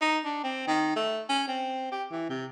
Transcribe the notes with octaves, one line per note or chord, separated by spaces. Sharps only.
D#4
D4
C4
D#3
A3
C#4
C4
G4
E3
C3